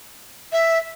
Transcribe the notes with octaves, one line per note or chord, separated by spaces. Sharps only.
E5